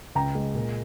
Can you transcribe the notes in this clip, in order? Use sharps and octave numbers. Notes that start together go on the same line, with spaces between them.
C#2 G5 A#5
G#3
A#2